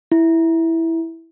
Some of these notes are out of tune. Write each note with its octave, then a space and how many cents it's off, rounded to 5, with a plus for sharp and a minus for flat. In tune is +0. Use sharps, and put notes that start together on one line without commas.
E4 -5